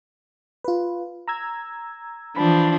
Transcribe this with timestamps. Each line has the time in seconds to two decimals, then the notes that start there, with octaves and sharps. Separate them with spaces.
0.64 F4 B4
1.28 A#5 E6 G#6
2.36 E3 F3 D4 B5